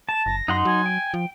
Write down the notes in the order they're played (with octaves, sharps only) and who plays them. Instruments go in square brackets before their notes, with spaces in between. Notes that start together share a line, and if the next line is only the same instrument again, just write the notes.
[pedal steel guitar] A5 [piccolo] E7
[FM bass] F#1 [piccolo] A#6
[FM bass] F#2 [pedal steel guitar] D#4 F#5 C6
[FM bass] F#3 [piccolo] G#5
[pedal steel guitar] G5
[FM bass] F3